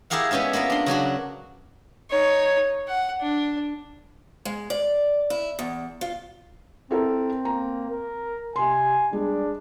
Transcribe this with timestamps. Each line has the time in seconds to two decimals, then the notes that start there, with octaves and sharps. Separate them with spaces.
0.10 E4 G4 G#4 A#4 F5 F#5
0.31 G#3 B3 C#4 D#4 E4
0.53 A#3 B3 F4 A#4
0.70 D4 C6
0.86 C#3 F#3 D4 F#4
2.10 D#4 C#5
2.88 F#5
3.21 D4
4.45 G#3
4.70 D5
5.30 E4
5.59 E2
6.01 F4
6.91 C4 E4 A4 A#4
7.45 A#3 A#5
7.90 A#4
8.56 C3 G#5 C6
9.13 G3 G#3 D4